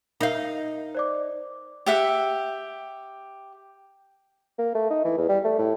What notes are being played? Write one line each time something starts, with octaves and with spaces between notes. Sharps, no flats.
D#4 A#4 E5 F5 G6
C5 D5 D6
G4 E5 F#5
A#3
A3
D#4
E3
E2
G3
A3
A2